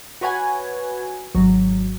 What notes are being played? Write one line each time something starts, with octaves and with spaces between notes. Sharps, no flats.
F#4 B4 C#5 F#5 G#5
G#1 F#3